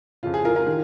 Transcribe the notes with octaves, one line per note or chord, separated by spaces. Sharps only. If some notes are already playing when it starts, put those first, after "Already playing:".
F2 C#3 F4
G#4
F4 A#4
F4 A#4
D#3